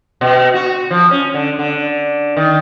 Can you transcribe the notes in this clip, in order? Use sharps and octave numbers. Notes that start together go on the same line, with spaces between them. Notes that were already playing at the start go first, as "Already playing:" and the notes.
B2
F#4
F3
C#4
D3
D3
D#3